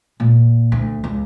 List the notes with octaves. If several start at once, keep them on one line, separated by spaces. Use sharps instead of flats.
A#2
D2
C#2